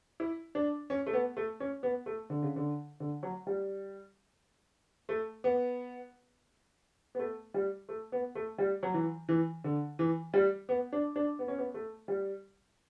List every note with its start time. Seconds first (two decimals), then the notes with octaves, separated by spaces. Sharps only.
0.20 E4
0.55 D4
0.90 C#4
1.07 A3
1.13 B3
1.37 A3
1.60 C#4
1.83 B3
2.06 A3
2.30 D3
2.43 C#3
2.56 D3
3.00 D3
3.23 F#3
3.47 G3
5.09 A3
5.44 B3
7.15 B3
7.19 A3
7.54 G3
7.89 A3
8.12 B3
8.35 A3
8.58 G3
8.83 F#3
8.94 E3
9.29 E3
9.64 D3
9.99 E3
10.34 G3
10.69 B3
10.92 D4
11.16 D4
11.39 B3
11.48 C#4
11.58 B3
11.74 A3
12.08 G3